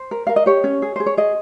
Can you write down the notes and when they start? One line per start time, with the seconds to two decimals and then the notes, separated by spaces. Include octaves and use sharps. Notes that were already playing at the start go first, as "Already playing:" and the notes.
Already playing: C5
0.11 A#4
0.27 A#4 F5
0.36 D#5
0.46 G4 C#5
0.64 C#4
0.82 G#4
0.96 G#4 C5
1.06 C#5
1.17 G#4 D#5